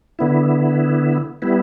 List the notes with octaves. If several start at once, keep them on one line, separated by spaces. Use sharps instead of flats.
D3 B3 E4
G3 B3 E4